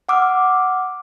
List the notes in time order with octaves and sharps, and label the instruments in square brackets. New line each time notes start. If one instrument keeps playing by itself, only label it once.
[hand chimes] F#5 D6 E6 F6